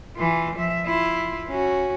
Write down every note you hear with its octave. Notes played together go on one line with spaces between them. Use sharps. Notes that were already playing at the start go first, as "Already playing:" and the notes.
E3 F4
F3 E5
E4 F4
C#4 F#4